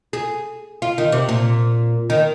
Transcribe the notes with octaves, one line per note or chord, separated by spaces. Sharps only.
G#4
F4
D#3
C3
A#2
D#3